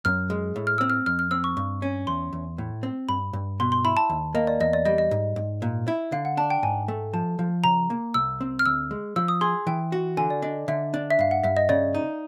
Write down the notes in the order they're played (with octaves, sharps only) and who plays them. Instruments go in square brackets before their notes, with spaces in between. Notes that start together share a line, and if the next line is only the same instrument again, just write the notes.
[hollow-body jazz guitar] F#2 [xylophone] F6
[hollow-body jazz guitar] G#3
A2
[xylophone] F6
[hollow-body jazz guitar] C4 [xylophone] E6
[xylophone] F6
[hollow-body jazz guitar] F2 [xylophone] F6
[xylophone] F6
[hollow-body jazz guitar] C4 [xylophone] E6
[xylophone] C#6
[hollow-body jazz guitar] G2 [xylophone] C#6
[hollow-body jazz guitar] C#4
[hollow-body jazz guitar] E2 [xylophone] C6
[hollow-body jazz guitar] E2
A2
C4
[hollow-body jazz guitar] G2 [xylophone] B5
[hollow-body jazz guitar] G2
[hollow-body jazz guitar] B2 [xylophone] C6
[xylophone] C6
[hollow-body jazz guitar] E4 [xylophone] B5
[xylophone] A5
[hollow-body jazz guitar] D#2
[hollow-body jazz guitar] A#3 [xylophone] D#5
[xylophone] D5
[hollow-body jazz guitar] E2 [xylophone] D#5
[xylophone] D5
[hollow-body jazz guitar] G3 [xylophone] D#5
[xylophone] D#5
[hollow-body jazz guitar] G#2
G#2
A#2
E4
[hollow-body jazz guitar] D3 [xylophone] F5
[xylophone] F#5
[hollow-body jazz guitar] D4 [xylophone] A5
[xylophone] G5
[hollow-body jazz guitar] G#2 [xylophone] G#5
[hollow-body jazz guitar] A3
[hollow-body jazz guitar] F3 [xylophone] A5
[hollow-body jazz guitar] F3
[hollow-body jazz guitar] C#3 [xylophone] A#5
[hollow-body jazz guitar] A#3
[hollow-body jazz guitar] C2 [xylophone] E6
[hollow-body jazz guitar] C4
[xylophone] F6
[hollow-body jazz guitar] D2 [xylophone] E6
[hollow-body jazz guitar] G#3
[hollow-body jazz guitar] F3 [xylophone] E6
[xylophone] D#6
[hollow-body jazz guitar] G#4 [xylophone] C6
[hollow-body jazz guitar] E3 [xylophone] G5
[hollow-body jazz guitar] F#4
[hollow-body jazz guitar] D3 [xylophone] G#5
[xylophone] D5
[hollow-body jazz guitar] D4 [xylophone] D#5
[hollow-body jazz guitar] D3 [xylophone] E5
[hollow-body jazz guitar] D4
[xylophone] E5
[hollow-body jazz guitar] G2 [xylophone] F5
[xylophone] F#5
[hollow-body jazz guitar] G2 [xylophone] E5
[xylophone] D#5
[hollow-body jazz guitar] C#3 [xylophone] D5
[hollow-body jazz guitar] D#4